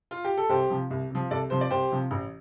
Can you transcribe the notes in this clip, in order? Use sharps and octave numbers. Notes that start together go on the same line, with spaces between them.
F4
G4
A4
C2 G4 C5
C3 F3
C2
C3 F3
C2 A4 D5
C3 F3 C5
D5
C2 G4 C5
C3 F3
A1